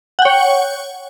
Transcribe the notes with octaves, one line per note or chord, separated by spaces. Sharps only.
C#5 F#5 G5